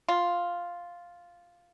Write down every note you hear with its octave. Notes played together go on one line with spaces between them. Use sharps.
F4